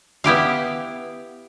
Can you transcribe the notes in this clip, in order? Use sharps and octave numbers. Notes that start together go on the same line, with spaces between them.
B3 E4 G4 F5